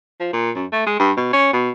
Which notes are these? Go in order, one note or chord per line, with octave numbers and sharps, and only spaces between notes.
F3
A#2
F#2
A3
G#3
G2
B2
C#4
B2